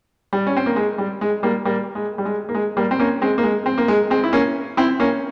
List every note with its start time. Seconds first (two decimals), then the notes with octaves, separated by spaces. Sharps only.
0.33 G3
0.47 C#4
0.57 C4
0.66 A#3
0.76 G#3
0.98 G3
1.21 G#3
1.43 G3 A#3
1.65 G3 A#3
1.95 G#3
2.18 G3
2.25 G#3
2.49 A#3
2.55 G#3
2.77 G3 A#3
2.91 C4
2.99 A#3 C#4
3.22 G#3 C4
3.38 A#3
3.44 G#3
3.66 C4
3.78 A#3
3.88 G#3
4.10 G#3 C4
4.24 E4
4.33 A#3 C#4
4.77 C4 E4
5.00 A#3 C#4